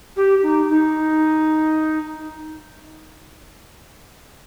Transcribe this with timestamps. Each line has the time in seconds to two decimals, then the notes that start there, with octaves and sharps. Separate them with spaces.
0.16 G4
0.42 D#4
0.69 D#4